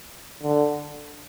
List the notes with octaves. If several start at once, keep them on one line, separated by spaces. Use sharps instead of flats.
D3